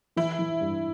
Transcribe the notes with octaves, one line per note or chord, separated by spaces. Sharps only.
E3 E4
E3
G2